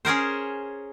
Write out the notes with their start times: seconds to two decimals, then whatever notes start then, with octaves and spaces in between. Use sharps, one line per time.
0.05 C#4 G#4 A#4 C5